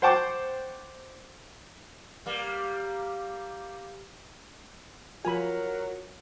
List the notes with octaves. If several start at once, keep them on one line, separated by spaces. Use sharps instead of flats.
C5 F#5 G5 A5 C#6 D6
G3 A#3
F3 F#3 F4 A#4 G#5 B5